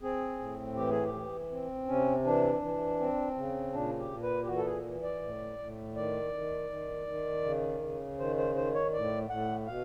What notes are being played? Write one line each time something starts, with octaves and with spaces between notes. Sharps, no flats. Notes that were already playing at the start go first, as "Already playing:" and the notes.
C4 G#4
A2
E3 G4
G#4
G4
E3
C4
C3 C#4
E3 D4
E3
C4
C#3
A#2 D4
G4
A#2
B4
G4
E3 F#4
A4
G#4
E3
D5
A2
A2
D#3 D5
D#3
D#3
D#3
C#3
C#3
D#3 C5
C5
D#3 C5
C#5
A2 D5
A2 F#5
B2 F5